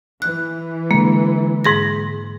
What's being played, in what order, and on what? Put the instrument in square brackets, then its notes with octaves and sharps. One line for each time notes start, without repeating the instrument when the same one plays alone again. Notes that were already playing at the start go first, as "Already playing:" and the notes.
[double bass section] E3 [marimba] F#6
[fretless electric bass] D3 G#3 [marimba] A#3
[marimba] G#2 G#4 A#6